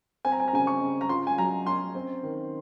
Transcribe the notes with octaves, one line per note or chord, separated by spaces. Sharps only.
C4 G#5
A#5
G#5
A#5
C#3 G#5
C#6
C#3
A#5
F4 C6
G#5
F#3 A#5
C#4 C6
C4
D#3